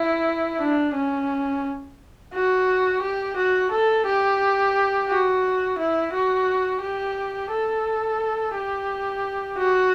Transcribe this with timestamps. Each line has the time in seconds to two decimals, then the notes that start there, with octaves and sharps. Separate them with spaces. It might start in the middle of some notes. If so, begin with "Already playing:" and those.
Already playing: E4
0.60 D4
0.94 C#4
2.33 F#4
3.02 G4
3.36 F#4
3.71 A4
4.06 G4
5.09 F#4
5.78 E4
6.13 F#4
6.82 G4
7.51 A4
8.55 G4
9.58 F#4